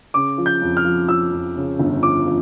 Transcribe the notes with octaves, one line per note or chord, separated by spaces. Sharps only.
C#3 D6
F3
G6
F2
F6
F3
F3 E6
F2
C#3
G1
F3 D6
F3